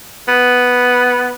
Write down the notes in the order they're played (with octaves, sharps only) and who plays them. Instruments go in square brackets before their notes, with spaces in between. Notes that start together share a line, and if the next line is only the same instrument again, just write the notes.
[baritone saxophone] B3